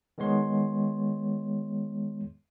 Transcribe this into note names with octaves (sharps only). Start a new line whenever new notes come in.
D#3 G#3 B3 C#5 C6